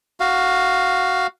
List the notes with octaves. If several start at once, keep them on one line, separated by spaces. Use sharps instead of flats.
F#4 F5